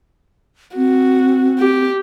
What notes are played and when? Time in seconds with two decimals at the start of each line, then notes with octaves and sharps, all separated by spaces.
0.76 C4 F#4
1.59 G4